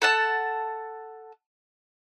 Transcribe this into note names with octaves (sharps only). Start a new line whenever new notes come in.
A4 F#5 A5